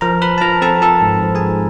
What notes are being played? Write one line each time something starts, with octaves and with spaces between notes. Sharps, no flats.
F3 A#4 A#5
F3 B4 B5
A5
F3 A#4 A#5
C4 A4 A5
F3 A4 A5
G#2
F3
G#4 G#5
G#2